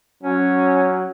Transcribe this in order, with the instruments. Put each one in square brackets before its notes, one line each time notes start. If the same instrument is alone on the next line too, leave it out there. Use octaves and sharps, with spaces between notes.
[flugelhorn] F#3 [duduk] C#4